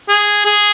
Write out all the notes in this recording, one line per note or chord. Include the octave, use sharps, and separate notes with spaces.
G#4
G#4